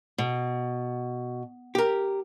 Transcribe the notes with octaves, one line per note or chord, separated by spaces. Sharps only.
B2
G4 A#4